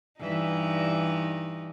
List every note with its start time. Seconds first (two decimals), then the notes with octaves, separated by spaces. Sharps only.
0.20 G2 E3 D#4